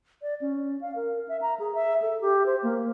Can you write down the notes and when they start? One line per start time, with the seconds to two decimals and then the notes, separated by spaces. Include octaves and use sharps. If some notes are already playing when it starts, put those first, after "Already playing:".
0.22 D5
0.41 C#4
0.81 F5
0.95 A#4
1.28 E5
1.42 A#5
1.59 G#4
1.75 E5
2.02 A4
2.21 G4
2.46 C5
2.63 A#3